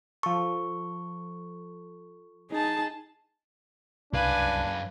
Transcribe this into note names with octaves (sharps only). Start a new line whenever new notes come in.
F3 A4 C#6
D#4 G#4 A5
C2 F#2 D4 B4 F5 G#5